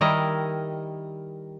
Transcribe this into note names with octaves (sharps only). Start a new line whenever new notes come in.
D#3 G3 E4 A#4 D5 D#5